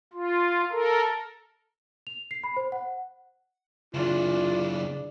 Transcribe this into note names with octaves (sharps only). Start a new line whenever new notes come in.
F4
A4 A#4
F7
C7
B5
C5
F#5
F#2 C#3 E3 D4 F4